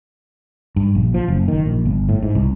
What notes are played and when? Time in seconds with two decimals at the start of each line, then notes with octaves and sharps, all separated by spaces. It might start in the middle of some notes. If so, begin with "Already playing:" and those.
0.76 G2
0.95 A#1
1.14 F3
1.28 F#1
1.48 D#3
1.66 A#1
1.85 G1
2.09 A2
2.23 G#2
2.35 C2